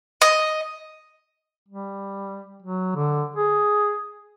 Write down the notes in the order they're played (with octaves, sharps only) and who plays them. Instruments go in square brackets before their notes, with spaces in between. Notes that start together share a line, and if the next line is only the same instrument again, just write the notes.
[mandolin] D#5
[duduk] G3
F#3
D3
G#4